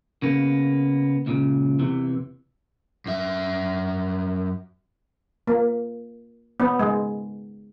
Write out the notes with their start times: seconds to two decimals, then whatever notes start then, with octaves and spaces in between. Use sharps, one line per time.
0.22 C#3 A#3 B3
1.26 C#2 A#2 C#3
1.79 E2 C3 E3
3.06 F#2 E5
5.47 A#3
6.60 B3
6.79 G#3